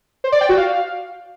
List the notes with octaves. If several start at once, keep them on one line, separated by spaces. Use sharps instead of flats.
C5
D5
G5
F#4
F5